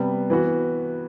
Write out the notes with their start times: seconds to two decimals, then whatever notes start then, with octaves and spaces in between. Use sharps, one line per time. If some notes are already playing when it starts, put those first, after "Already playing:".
Already playing: C3 G3 B3
0.30 E3 B3 F#4